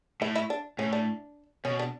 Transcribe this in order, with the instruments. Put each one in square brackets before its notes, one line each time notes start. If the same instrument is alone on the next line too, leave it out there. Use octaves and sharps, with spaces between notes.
[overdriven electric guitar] A2 [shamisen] E4
[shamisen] E4
D4
[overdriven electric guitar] A2 [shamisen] C#4
[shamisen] D4
[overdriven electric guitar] B2 [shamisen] C#4
[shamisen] D4